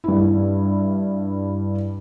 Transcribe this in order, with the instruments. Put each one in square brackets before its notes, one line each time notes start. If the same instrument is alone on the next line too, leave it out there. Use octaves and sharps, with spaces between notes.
[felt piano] G2 E4